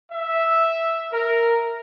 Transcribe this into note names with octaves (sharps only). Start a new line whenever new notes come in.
E5
A#4